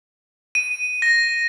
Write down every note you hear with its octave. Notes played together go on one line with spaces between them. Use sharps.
D#7
A#6